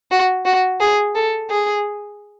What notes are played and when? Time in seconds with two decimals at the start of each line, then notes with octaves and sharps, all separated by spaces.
0.11 F#4
0.46 F#4
0.80 G#4
1.15 A4
1.50 G#4